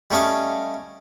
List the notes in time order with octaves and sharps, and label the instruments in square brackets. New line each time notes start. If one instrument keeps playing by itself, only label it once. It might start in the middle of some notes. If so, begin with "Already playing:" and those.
[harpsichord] G3 A3 C#4 D#5 F5